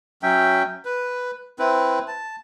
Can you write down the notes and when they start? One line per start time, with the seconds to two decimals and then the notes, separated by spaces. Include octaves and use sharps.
0.23 F#3 C#4 E5 G5
0.85 B4
1.59 C4 E4 B4
2.08 A5